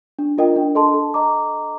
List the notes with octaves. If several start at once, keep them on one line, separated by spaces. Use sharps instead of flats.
D4
F4 A#4 D#5 G5
D4
A4 D#5 A5 C6
A4
D#5 A#5 D6